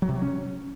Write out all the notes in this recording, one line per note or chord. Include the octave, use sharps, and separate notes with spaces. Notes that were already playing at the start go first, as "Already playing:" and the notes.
F#3
C3
F#3
C#4